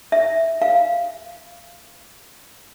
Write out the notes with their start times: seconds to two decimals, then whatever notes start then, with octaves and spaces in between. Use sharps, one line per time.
0.12 E5
0.62 F5